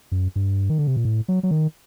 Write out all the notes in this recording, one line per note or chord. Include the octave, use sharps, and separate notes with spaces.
F#2
G2
D#3
D3
C3
A#2
A2
F#3
F#3
D#3